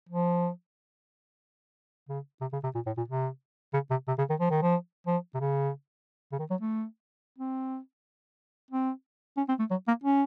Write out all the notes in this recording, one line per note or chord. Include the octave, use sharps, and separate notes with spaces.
F3
C#3
C3
C#3
C3
A#2
A2
A#2
C3
C#3
C3
C3
C#3
D#3
F3
D#3
F3
F3
C3
C#3
C#3
D#3
F#3
A3
C4
C4
C#4
C4
A3
F#3
A#3
C#4